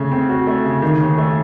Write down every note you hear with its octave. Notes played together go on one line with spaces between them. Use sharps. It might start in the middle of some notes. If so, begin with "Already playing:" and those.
Already playing: C#3 A3
C4
F#4
A3
C#3
D#3
D#2
A3